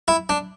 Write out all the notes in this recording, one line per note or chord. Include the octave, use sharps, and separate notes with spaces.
E4
D4